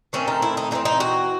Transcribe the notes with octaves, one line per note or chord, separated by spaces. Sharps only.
D#3 A3 C4 C#4
D#4
E4
D#4
E3 A3 C4 D#4
D#4
F#4